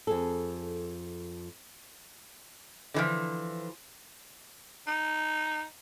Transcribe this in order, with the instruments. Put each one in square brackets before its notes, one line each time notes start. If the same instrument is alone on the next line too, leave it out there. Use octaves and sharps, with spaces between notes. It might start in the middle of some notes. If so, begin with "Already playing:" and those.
[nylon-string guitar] F2 G#4 A4
[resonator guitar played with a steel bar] D3 E3 F3
[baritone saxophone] D#4